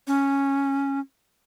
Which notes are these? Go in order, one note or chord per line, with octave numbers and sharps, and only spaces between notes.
C#4